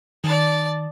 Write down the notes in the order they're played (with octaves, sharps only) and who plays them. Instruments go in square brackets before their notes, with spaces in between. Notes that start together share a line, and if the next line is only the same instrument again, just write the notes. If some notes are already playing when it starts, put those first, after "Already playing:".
[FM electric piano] D#3 [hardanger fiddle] D5 A5